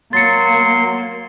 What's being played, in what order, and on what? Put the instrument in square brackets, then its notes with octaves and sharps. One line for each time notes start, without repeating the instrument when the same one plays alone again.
[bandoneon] F#3 C6 [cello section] A#3 [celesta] A6 C#7